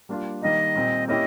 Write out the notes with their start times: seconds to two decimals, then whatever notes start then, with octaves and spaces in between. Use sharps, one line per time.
0.09 G3 A#3 D4 F4
0.42 D#3 G3 A#3 D#4 D#5
0.76 A#2 G3 C4
1.08 A#3 C#4 E4 G4 D#5